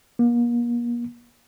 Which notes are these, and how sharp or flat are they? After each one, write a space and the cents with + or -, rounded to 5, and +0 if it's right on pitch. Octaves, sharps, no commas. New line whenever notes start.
A#3 +40